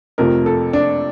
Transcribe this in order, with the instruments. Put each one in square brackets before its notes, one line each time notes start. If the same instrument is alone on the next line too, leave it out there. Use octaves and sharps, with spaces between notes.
[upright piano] F2 C3 F3 A3 A#4
A4
D4